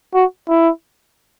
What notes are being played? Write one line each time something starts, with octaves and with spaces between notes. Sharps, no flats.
F#4
E4